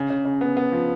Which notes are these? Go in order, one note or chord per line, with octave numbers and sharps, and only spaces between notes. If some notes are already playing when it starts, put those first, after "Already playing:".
Already playing: C#3
C#3
C#3
B3
B3
F3